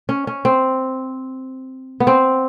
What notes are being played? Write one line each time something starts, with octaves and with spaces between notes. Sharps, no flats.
C#4
C#4
C4
B3
C4